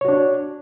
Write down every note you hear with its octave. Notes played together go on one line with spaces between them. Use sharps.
D4 F#4 C#5